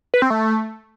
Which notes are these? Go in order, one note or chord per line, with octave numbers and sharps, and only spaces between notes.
B4
C4
A3